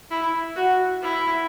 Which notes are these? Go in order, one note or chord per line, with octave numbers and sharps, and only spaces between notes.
E4
F#4
E4